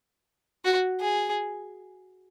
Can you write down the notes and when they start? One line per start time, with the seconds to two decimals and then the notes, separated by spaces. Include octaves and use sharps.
0.64 F#4
1.00 G#4